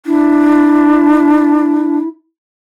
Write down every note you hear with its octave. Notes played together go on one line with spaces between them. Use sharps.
D4 E4